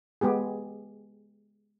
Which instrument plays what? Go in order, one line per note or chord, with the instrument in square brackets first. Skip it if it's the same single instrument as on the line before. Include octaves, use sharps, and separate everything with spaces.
[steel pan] G#3 B3 G4 G#4